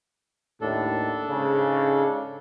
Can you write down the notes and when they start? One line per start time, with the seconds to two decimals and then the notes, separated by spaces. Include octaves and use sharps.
0.61 D#2 A2 D4 A4
1.28 G#2 C#3